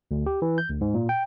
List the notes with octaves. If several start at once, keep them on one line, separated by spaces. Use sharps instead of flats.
D2
G4
E3
G6
D2
G#2
A#2
G5